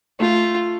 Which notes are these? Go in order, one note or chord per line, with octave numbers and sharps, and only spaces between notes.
A3 F4